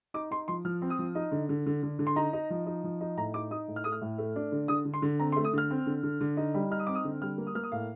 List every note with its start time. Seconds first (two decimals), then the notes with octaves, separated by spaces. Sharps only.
0.14 D#4 D6
0.31 D#4 C6
0.48 F3 C6
0.65 F3 F6
0.82 C4
0.90 D#6
0.99 F3
1.15 D#4
1.31 D3
1.49 D3
1.66 D3
1.83 D3
1.99 D3
2.07 C6
2.16 D#4 A#5
2.33 D#4
2.50 F3
2.66 D#4
2.84 F3
3.01 D#4
3.17 A2 A#5
3.34 D#4 D6
3.51 D#4 D#6
3.68 A2
3.76 F6
3.84 A3 D#6
3.92 F6
4.01 A2
4.18 A3
4.36 D4
4.52 D3
4.68 D3 D#6
4.85 D3
4.94 C6
5.02 D3
5.20 C4 A#5
5.32 C6
5.36 A3
5.45 D#6
5.53 D3 F6
5.70 C4
5.86 D3
6.03 D3
6.21 D3
6.37 D#4
6.54 G3
6.71 D#4 F6
6.79 D#6
6.87 C4 D6
6.95 D#6
7.04 D3
7.21 G3 F6
7.38 A#3
7.47 D#6
7.55 A#3 F6
7.63 D#6
7.72 A2 F5